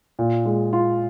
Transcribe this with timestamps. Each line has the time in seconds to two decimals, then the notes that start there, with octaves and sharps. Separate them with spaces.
0.19 A#2
0.46 G#3
0.73 F4